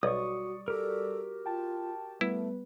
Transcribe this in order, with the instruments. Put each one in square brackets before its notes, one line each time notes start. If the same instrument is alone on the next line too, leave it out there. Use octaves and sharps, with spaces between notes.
[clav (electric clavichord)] B1 [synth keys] G3 D5 [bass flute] F#4 [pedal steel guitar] C#6 D#6
[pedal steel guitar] F#4 G4 A#4 [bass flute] A4
[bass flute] F4 [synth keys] G5 A5
[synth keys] G3 B3 B4 [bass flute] A3 [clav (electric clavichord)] E4